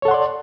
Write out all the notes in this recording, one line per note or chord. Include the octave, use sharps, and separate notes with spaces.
A4 C#5 D5 F#5 C6